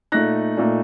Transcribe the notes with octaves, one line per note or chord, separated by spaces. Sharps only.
A#2 A3 D#4 F#6 A#6
A#2 A3 D#4